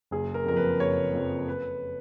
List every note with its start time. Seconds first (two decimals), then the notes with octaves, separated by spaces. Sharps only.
0.11 F#1 G#4
0.34 A#4
0.45 F2 F3 A#4
0.56 B4
0.80 F#1 C#5
1.13 F2 F3
1.48 B4